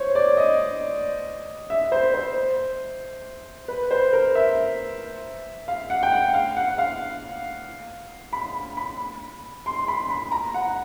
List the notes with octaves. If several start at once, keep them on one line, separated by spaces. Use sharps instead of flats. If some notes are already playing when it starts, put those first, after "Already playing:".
Already playing: C5 C#5
D5
D#5
E5
C5
C5
B4
C5
A#4
E5
F5
F#5
G5
F#5
F5
F#5
F5
B5
B5
C6
B5
B5
A#5
F#5